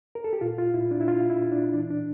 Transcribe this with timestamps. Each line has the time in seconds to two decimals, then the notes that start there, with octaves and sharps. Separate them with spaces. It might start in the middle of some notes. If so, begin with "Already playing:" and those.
0.15 A#4
0.24 A4
0.33 G4
0.41 A#2 F4
0.58 F4
0.74 A#2 E4
0.91 D4
1.01 E4
1.08 A#2 F4
1.30 E4
1.41 A#2
1.52 D4
1.74 E3 D4
1.90 D4